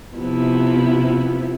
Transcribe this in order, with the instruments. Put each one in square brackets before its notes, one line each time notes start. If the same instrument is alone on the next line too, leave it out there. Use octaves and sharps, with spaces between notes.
[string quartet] C3 F3 B3 E4